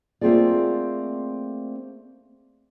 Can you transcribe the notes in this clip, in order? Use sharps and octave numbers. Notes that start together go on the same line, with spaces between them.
A3 A#3 C4 F4 G#4 D5